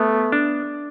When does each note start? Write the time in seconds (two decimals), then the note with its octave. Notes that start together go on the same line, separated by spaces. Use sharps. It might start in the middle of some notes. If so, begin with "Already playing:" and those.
Already playing: A3 B3
0.32 D4